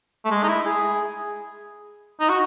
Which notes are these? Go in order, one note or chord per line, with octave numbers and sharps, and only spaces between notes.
A3
G#3
D#4
E4
G#4
D#4
F#4